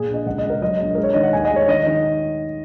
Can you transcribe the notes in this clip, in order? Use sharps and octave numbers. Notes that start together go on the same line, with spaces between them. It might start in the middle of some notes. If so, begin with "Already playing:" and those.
Already playing: A#2 G#4
A#1
D#5
C#2 F#5
D#5
C#2
A#4
F#3 D#5
A#1
G#3 A#4
C#5
D#3 D#5
F#5
D#2 G#5
D#5
G#3
C#5
D#3 D#5
D#3